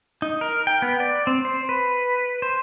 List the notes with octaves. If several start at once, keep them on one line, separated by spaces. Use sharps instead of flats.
D#4
A#4
G5
B3
D5
C4
C5
B4
C5